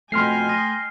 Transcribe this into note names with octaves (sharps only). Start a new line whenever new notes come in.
F2 B2 A3 G5 G#5 C6 F6 C7
D#5